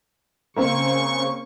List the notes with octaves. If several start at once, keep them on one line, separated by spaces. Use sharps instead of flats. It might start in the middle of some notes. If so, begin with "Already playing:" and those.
C#3 A#3 C4 C#6